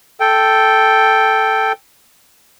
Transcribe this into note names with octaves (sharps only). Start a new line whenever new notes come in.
A4 G5